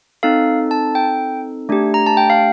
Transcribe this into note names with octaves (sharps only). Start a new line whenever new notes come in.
C4 D#4 A4 F5
A5
G5
A3 D4 G4
A#5
A5
G5
F5